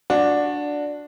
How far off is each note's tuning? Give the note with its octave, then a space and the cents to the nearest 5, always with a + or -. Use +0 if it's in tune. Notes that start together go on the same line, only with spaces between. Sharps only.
D4 +0 F#4 -20